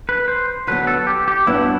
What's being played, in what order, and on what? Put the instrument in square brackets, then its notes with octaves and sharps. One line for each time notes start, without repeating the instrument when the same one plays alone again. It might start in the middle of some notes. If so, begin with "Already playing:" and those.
[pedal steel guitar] B4
C5
[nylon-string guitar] D3 F#3 B3 [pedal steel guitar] B4
[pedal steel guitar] A4
G4
G4
[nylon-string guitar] G2 F#3 B3 D4 [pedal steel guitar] E4